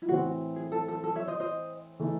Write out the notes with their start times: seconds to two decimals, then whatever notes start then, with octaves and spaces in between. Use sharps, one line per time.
0.02 E4
0.08 A2 E3 C4 F#4
0.56 G#4
0.72 A4
0.88 A4
1.04 A4
1.15 C#5 E5
1.27 C5 D#5
1.40 C5 D#5
2.00 E3 A3 D#4